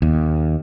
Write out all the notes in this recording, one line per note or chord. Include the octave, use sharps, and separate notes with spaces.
D#2